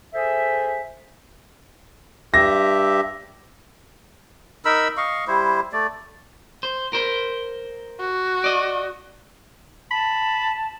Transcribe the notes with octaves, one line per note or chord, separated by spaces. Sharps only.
G#4 A4 C5 E5
G2 G4 E5 A#6
D#4 A#4 B5 E6
D#5 F5 C#6
G3 E4 C5
A3 D5
C5
A#4 C5
F#4
D5 D#5
A5 B5